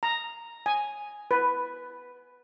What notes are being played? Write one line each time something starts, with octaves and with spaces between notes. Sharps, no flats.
A#5
G#5
B4